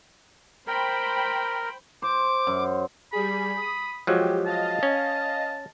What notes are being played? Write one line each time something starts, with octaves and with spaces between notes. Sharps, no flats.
A#4 C5 G5 B5
C5 D6
F#2
G3 G#4 B5
D#6
F3 F#3 G#3 G4
D#5 F5 A5 A#6
C#4